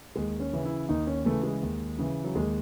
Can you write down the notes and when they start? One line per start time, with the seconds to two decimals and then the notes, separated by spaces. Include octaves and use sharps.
0.16 D#2 G#3
0.40 C#4
0.53 C#3 E3
0.65 E4
0.89 D#2 D#4
1.07 C#4
1.25 C#3 E3 A3
1.43 G#3
1.63 D#2
1.99 C#3 E3
2.24 F#3
2.35 D#2 G#3